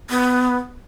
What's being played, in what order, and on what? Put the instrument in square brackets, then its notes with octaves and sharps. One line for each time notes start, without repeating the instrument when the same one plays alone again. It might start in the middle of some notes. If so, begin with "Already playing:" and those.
[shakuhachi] B3